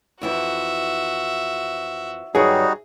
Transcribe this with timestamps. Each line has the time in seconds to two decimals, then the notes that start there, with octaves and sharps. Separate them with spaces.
0.22 F2 E3 F3 F#4 E5
2.35 G2 D#3 F#3 G3 D#4 F#4 G#4